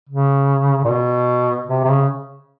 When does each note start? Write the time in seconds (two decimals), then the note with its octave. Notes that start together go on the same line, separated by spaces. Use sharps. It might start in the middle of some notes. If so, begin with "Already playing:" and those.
0.09 C#3
0.85 A#2
0.89 B2
1.70 C3
1.84 C3
1.89 C#3